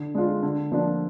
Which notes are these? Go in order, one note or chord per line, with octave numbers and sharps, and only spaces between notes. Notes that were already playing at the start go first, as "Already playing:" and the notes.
Already playing: D3
G#3 D4 F4
D3
F3 A#3 D4 F4